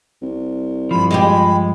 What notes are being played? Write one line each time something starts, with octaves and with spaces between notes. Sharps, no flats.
C2
G2 F3 B5
G#3 F4 G4 B5